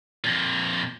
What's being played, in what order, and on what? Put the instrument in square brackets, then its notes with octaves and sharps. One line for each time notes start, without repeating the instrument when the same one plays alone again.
[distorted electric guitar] F2 A#2